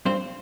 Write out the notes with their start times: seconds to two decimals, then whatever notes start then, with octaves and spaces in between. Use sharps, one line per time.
0.05 G2 C4 C5